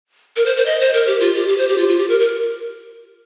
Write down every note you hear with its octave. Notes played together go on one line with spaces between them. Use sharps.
A#4
C5
C5
D#5
C5
A#4
G4
F4
G4
G4
C5
G4
F4
F4
G4
A#4
A#4